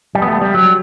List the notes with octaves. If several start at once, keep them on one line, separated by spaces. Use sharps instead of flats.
G3
B3
A3
G3
F#3